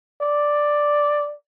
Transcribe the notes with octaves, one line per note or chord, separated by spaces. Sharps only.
D5